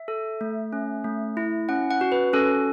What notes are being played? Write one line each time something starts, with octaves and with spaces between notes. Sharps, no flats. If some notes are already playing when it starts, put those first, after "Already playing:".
Already playing: E5
A4
A3
C#4
A3
E4
C#4 F#5
F#5
F#4
B4
C#4 A4